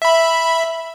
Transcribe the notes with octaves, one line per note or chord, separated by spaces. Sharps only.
E5 B5